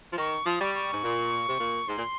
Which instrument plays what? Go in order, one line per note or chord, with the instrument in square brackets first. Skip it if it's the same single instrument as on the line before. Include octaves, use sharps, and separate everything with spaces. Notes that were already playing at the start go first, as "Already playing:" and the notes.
[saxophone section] F3
[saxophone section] D#3 [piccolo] C#6
[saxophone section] F3 [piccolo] D#6
[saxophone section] G3 [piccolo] C#6
[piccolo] C#6
[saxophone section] G#2
A#2
C3
A#2
[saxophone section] G#2 [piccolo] C6
[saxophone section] A#2